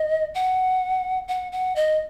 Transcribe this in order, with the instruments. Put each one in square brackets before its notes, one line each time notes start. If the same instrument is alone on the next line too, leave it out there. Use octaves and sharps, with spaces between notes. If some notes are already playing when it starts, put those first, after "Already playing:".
Already playing: [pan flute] D#5
F#5
F#5
F#5
D#5